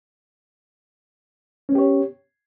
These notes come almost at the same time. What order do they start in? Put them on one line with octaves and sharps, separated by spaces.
C#4 B3 G4 C#5